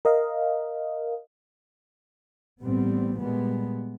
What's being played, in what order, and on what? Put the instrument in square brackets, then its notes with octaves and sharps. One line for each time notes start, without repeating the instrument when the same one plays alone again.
[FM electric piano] A#4 D#5 F5
[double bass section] A1 G3 B3 C4
A#2 G3 G#3 B3